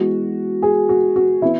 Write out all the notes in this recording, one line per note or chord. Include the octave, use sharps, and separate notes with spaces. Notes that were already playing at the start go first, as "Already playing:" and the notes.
Already playing: E3 G#3 B3 F#4
G#4
F#4
F#4
E3 B3 E4